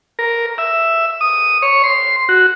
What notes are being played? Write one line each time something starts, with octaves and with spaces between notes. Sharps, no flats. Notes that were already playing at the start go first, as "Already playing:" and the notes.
A#4
E5
D#6
C#5
C6
F#4